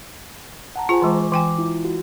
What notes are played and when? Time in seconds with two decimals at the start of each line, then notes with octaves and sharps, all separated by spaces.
0.76 F#5 A5 A#5
0.89 F4 G#4 C5 G#5 A#5
1.02 E3 G#3 C#6 D6
1.32 E3 G5 G#5 D6
1.58 E4 F4
1.85 F#4